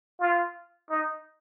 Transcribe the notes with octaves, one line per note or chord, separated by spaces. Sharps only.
F4
D#4